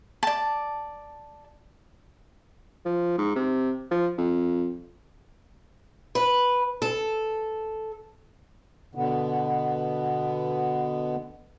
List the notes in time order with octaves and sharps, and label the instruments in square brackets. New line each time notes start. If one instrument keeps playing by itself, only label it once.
[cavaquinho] D5 A5
[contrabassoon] F3
G#2
C3
F3
F2
[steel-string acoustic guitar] B4
A4
[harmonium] B2 D3 B3